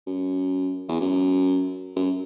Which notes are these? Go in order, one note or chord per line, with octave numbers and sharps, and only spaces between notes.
F#2
E2
F#2
F#2